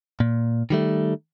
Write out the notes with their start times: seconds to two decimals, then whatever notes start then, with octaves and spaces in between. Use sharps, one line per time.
0.20 A#2
0.70 D#3 G3 A3